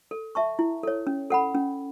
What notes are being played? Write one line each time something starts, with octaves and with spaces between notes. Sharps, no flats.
A4
E5 A5 C#6
E4
A4 C#5
C#4
A4 F#5 B5
C#4